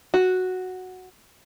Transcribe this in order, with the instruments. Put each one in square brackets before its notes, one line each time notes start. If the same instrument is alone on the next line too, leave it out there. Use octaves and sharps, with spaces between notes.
[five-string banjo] F#4